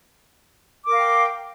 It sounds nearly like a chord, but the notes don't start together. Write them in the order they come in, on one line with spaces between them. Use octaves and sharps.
D6 A#4 F5 G5